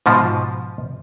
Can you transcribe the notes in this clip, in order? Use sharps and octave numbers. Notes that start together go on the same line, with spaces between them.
G#2 B2 F3